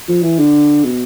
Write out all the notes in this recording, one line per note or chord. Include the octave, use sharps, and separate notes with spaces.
F3
E3
D3
B2